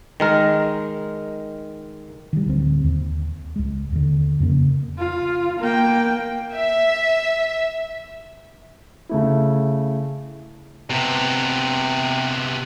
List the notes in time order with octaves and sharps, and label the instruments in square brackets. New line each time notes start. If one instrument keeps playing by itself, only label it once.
[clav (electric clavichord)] D#3 G#3 A#4
[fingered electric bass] D#3 G3
D1 D2 C4
D#2
C#2 G#3
D#2 D3
F2 C#3 A#3
[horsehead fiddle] F4
A#3 G5
[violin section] E5
[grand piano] C#3 A3 E4
[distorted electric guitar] C3 B3